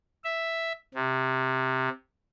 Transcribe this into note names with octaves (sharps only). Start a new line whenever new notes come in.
E5
C3